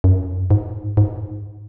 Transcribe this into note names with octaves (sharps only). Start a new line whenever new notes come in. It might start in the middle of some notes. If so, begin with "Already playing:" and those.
F#2
G#2
G#2